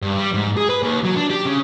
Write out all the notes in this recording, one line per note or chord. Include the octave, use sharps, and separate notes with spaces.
G2
G3
G#2
G#4
B4
D#2
F#3
D4
G4
C#3